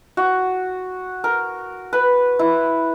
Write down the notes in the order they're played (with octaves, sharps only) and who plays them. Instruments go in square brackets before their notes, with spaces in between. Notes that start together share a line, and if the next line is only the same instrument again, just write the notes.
[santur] F#4
A#4
B4
E4